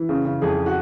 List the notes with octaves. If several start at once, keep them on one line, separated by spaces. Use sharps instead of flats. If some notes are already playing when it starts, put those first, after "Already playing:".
Already playing: E3
C#3
C#3
F2 G#4
F#4